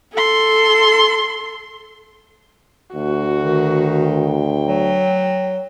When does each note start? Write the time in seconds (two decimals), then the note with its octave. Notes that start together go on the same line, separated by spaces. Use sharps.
0.13 A4 C6
2.95 D2 F#4
3.43 D#3
4.05 G5
4.67 F#3